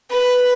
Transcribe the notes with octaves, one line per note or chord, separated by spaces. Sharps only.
B4